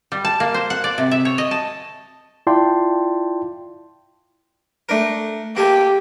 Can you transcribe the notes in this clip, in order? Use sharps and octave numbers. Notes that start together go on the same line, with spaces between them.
G3
A5
A#3
C5
F#5
D5
C3
E5
C#5
D#5
A5
E4 F4 D5 G5 A5 C6
A3 D4 A#4
A#3 G4 A4 G#5